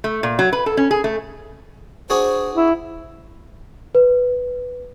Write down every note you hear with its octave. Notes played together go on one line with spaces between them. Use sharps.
A3
A#2
F#3
B4
A4
C#4
G#4
A3
D4 F#4 G#4 C5
E4
B4